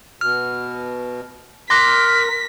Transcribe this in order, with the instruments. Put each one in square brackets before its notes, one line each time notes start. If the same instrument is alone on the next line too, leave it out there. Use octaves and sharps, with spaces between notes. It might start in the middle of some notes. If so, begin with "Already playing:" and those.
[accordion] B2 [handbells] F6
[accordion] A#4 [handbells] C6 D6 F#6 [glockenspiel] A#6 [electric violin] B6